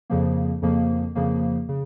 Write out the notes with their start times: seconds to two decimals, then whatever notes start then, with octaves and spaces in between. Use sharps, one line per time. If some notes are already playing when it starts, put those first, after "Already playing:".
0.10 F2 C#3 F3 A#3
0.62 F2 C#3 F3 A#3
1.15 F2 C#3 F3 A#3
1.69 C#3